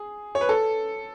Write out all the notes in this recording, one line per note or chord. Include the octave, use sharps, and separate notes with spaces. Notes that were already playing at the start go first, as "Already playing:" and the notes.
Already playing: G#4
C#5
B4
A4